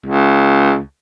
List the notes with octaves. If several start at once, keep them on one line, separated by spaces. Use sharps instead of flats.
C#2